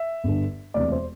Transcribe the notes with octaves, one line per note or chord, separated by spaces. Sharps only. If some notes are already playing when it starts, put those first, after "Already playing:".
Already playing: E5
G1 G2 D3
E1 D2 C3 E3 D5
C5